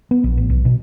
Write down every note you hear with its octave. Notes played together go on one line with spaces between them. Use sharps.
B3
A#1
A1
B1
B2